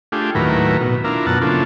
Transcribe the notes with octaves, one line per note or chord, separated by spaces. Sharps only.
A3 D4 F4 G4 G#4
D#2 A2 F#3 E4 A#4 B4
B2
D4 E4 F4 A#4
F#2 B2 F#5 A5
C#3 F3 A#3 D4 E4 A4